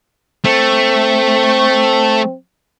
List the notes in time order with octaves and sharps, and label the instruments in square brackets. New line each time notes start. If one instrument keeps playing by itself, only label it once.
[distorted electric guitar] A3 [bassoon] C4